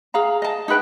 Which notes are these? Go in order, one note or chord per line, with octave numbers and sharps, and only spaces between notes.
G#4 F5 A#5
D#5 A5
D#4 G#4 B4 G5